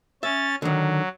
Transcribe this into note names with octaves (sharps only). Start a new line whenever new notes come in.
C#4 E5 A6
D3 D#3 F#3